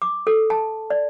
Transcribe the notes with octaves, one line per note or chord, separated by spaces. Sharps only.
D6
A4
A5
D5